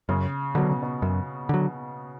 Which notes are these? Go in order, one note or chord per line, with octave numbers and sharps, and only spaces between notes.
F#2 C#3
B2 D3 F#3
C#3
B2
F#2
D3 F#3